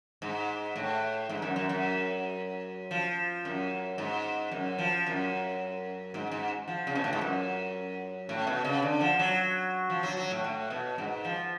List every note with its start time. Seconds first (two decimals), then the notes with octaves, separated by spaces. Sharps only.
0.22 G#2
0.76 A2
1.29 G#2
1.42 F#2
1.56 F#2
1.69 F#2
2.91 F3
3.45 F#2
3.98 G#2
4.52 F#2
4.78 F3
5.07 F#2
6.14 G#2
6.32 G#2
6.68 F3
6.87 C#3
6.95 B2
7.04 A2
7.13 G#2
7.21 F#2
8.29 A2
8.47 B2
8.65 C#3
8.82 D3
9.01 F3
9.19 F#3
9.90 F3
10.03 F#3
10.17 F#3
10.31 A2
10.44 A2
10.70 B2
10.98 G#2
11.25 F3